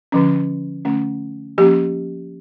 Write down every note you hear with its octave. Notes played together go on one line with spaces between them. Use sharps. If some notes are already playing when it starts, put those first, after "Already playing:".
D3 F3 C#4
D3 A3 C#4
F3 A#3 C#4 G4